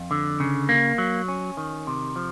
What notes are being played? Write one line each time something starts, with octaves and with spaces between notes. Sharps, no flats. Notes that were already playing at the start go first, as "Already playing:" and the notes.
Already playing: F2
D3
C#3
A#3
F#3
C#4
D#3
C3
F3